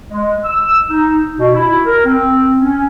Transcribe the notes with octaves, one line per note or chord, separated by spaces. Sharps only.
G#3
E6
D#4
B2
E4
A#4
C4
C#4